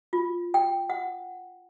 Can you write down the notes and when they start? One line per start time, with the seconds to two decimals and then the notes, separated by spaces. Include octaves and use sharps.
0.13 F4
0.54 G5
0.90 F#5